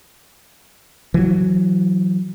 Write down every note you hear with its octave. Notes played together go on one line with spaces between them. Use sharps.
E3 F#3